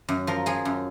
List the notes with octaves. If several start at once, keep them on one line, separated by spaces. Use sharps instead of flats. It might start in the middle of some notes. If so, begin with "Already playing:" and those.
F#2
F3 A#4
F3 G#4
F#2